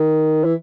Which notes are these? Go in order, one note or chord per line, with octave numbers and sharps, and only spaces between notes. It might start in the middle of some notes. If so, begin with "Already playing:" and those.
Already playing: D#3
E3